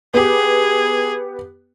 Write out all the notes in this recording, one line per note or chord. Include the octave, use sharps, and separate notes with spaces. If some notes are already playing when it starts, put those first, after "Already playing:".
B3 G4 G#4